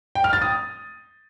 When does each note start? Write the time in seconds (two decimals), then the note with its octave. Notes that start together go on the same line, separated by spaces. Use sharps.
0.15 G5
0.24 F6
0.33 A6
0.42 D#6